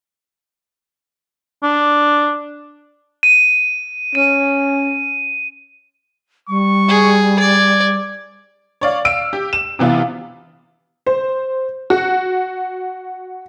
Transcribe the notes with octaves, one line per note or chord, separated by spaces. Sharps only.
D4
D#7
C#4 D#7
G3 C#6
G#4
D5 G#6
C#5 D5 F5
F5 E6 D7
G4
E7
C3 E3 B3 F4
C5
F#4